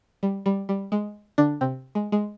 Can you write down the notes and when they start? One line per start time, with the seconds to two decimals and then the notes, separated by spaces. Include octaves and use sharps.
0.23 G3
0.46 G3
0.69 G3
0.92 G#3
1.38 D3 D4
1.61 C3 C4
1.95 G#3
2.12 G#3